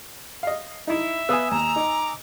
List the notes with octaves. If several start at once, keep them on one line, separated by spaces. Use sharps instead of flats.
D#5 F5
D#4 E4 E5
B3 B4 F5 G#5 D#6 E6
D#2 A#5 E7
D#4 D6